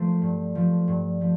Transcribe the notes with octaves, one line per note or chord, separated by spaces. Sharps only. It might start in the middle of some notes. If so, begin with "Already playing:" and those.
Already playing: F3 A3 C5
G2
F3 A3
G2
F3 A3